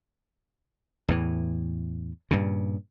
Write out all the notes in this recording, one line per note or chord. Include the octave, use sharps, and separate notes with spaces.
E2 A2 E3
G2 A#2 C#3